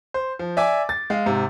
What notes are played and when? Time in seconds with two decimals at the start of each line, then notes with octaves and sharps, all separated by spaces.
0.14 C5
0.39 F3
0.57 D5 E5 G#5 D6
0.89 A6
1.10 G#3 F5
1.26 G#2 C3